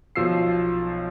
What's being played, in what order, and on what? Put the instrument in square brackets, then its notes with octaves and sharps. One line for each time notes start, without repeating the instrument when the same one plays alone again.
[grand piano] B1 F3 E6 C7